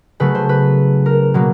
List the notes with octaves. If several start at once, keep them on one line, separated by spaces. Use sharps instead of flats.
C#3 F#3 A3 B4
C5
B4
A#4
B2 F#3 A#3